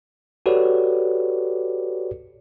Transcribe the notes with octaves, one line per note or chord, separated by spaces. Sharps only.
F#4 G4 A4 B4 C#5 D5